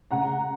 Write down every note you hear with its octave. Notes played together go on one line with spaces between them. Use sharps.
C#3 F#5 A#5